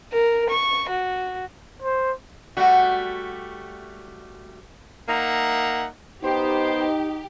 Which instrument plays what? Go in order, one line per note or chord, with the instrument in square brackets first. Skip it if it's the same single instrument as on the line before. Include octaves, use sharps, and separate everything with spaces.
[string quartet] A#4
C#6
F#4
[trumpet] C5
[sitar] G3 A3 F#4
[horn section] A#3 D#4 E5 F#5
[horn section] B3 C5 [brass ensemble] D#4 [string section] G4